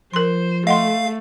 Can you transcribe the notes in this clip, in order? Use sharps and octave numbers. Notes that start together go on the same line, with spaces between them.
F3 A#4 C5 C6
A3 D#5 F5 F#5 C6